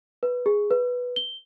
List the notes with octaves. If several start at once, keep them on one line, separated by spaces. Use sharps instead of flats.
B4
G#4
B4
G7